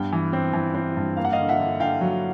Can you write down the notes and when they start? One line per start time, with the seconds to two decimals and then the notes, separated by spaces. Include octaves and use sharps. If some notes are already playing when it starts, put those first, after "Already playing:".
Already playing: G2 B3 G5
0.12 E3
0.33 C4
0.53 E3
0.75 C4
0.97 G2
1.17 A#3 F5
1.25 F#5
1.32 D#5 F5
1.39 D3
1.49 E5 F#5
1.60 D3
1.80 D3 F5 G5
2.01 F#3